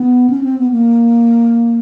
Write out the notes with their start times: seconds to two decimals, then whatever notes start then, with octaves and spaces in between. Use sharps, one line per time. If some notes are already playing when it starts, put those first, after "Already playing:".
Already playing: B3
0.30 C#4
0.44 C4
0.58 B3
0.71 A#3